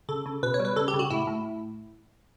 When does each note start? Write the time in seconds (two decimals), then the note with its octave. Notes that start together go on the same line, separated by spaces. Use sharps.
0.09 C#3 A4
0.26 C#3
0.43 B2 B4
0.54 C#5
0.60 G3
0.65 B4
0.76 C#3 A4
0.88 G4
0.94 C#3
0.99 F#4
1.10 A2 E4
1.27 A2